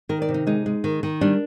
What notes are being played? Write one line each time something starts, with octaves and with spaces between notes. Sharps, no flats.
D#3 A#4
D5
C3
D#4
G#3 D#4
G#3
D#3
D#3
G3 D4